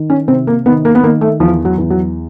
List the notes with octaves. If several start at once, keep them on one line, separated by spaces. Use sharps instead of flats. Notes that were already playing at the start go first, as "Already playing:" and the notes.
Already playing: D#3
C#4
C3 C4
A#3
D#3 B3
A#3
B3
D#3 A#3
A3
E2 F3
F#3
E2
F#3